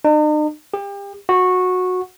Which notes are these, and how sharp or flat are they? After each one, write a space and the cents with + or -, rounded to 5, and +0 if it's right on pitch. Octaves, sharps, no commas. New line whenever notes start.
D#4 -45
G4 +35
F#4 -15